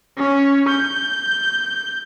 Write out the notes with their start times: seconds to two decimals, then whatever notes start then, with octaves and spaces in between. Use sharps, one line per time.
0.18 C#4
0.69 G6